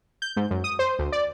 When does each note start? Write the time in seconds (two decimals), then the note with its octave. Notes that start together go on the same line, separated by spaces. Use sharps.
0.22 G6
0.36 G#2
0.51 F#2
0.64 D#6
0.79 C5
0.99 D2
1.12 D5